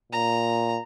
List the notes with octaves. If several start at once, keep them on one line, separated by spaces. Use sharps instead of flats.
A#2 A#5